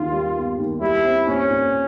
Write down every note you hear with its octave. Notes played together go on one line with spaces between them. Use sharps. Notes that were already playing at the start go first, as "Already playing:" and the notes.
Already playing: D#2 D#3 F4
G3
B3
D#2
G3 E4
C4
A#2 C#4
A#2